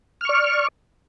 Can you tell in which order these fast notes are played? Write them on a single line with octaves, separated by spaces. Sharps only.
F6 C#6 D5